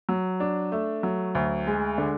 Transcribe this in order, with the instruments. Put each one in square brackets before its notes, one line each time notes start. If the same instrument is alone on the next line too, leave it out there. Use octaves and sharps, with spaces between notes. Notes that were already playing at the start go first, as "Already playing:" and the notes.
[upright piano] F#3
D4
A3
F#3
D2
G#3
D3